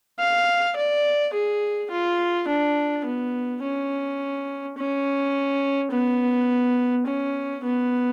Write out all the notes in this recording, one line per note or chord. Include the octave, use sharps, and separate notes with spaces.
F5
D5
G#4
F4
D4
B3
C#4
C#4
B3
C#4
B3